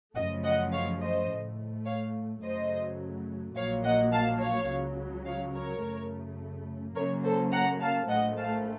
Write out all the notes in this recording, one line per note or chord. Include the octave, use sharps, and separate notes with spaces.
F#2 C#3 F3 A3 D#5 F#5
D#5 F#5
C#5 F5
C5 D#5
A2 A3
C#5 F5
F#2 C#3 F#3 A3 C5 D#5
A#1 A#2 F#3 A#3 C#5 F5
D#5 F#5
F5 A5
C#5 F5
C#2 C#3 F#3
C#5 F5
A#4 C#5
F#2 C#3 A3
F#2 C#3 F#3 A#3 A#4 C#5
A4 C5
F#5 A#5
F5 A5
A#1 A2 A3 D#5 F#5
F5 A5